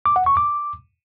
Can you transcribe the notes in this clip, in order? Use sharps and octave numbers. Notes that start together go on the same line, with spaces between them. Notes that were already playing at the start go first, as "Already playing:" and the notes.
D6
F#5
C#6
D6